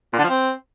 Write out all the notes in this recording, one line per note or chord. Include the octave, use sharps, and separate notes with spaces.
A#2
D3
F3
C4